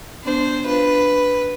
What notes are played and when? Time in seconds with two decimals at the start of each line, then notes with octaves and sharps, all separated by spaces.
0.25 B3 D4 C5
0.66 D4 F4 B4